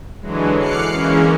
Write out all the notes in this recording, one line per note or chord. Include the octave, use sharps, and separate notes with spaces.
D3 E3 F#3 G#3
D6 F6 F#6 C7 C#7
E3 G#3 A#3 C#4